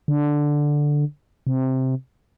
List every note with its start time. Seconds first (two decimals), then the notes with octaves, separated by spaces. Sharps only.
0.08 D3
1.47 C3